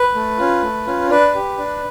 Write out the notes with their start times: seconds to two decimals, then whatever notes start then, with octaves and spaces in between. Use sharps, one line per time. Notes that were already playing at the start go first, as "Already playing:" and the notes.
Already playing: B4
0.15 A3
0.38 C#4 F4
0.62 A3
0.87 C#4 F4
1.10 D4 B4
1.35 G4
1.58 D4